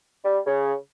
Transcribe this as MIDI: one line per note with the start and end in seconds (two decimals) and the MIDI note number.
0.25 0.39 55
0.47 0.74 49